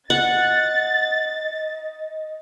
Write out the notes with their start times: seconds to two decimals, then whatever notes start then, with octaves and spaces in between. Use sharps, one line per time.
0.10 D#5 F#5 A6